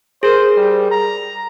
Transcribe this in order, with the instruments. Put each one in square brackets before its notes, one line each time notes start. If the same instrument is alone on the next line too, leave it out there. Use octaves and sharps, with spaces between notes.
[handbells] G#4 A#4 [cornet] C5
[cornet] G3
A#5